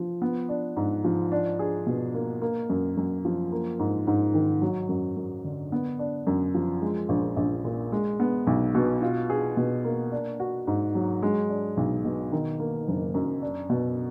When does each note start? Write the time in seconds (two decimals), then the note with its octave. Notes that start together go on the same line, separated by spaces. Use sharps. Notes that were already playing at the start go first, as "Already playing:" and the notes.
Already playing: F3
0.22 B3
0.49 D4
0.77 G#2
1.04 F3
1.32 D4
1.59 G#4
1.86 B2
2.14 A#3
2.41 A#3
2.70 F#2
2.97 F#2
3.25 F3
3.52 A#3
3.79 G#2
4.07 G#2
4.34 D#3
4.62 F#3
4.89 F#2
5.17 F#2
5.44 D3
5.72 B3
5.99 D4
6.27 F#2
6.55 F3
6.82 G#3
7.09 A#1
7.37 A#1
7.65 A#2
7.92 G#3
8.20 B3
8.47 B1
8.75 B2
9.02 F4
9.30 G#4
9.57 B2
9.84 A#3
10.12 D4
10.40 F#4
10.67 G#2
10.95 F#3
11.23 G#3
11.49 D4
11.77 B1
12.05 B2
12.32 D#3
12.60 A#3
12.88 F#1
13.14 F#2
13.42 D4
13.70 B2